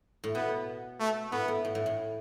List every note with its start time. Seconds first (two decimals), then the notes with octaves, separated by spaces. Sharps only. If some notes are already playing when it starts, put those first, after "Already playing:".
0.24 A2
0.35 B2 B3
0.99 A3
1.32 A2 B3
1.48 A2
1.65 A2
1.75 A2
1.86 A2